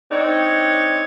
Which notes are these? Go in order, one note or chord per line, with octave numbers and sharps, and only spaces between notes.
C4 D4 D#4 C#5